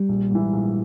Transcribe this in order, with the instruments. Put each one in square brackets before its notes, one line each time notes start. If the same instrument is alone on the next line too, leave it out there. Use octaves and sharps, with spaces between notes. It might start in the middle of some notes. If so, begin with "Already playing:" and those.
Already playing: [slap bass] G3
[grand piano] A#1
G#2 E3
A#1